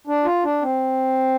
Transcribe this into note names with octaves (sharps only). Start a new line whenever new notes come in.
D4
F4
D4
C4